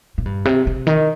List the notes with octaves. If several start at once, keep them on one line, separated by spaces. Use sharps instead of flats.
A#2
G2
C3
C3
D#3